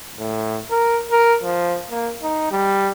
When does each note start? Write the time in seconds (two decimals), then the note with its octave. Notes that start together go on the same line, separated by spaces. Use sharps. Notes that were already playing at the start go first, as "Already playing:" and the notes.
0.19 A2
0.71 A#4
1.11 A#4
1.43 F3
1.90 A#3
2.23 D#4
2.51 G3